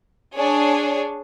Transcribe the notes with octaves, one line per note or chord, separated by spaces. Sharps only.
D4 G#4 C#5